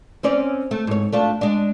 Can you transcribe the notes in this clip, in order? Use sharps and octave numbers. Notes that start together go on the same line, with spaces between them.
C4 C#4 D5
A3
G#2 C#5
A3 D4 F4
G#3 D4